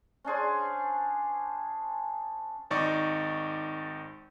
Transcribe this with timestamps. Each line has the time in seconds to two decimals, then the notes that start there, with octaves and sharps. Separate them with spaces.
0.24 C#4 D4 G#4 C5
2.70 G#1 D#4 D5 C#6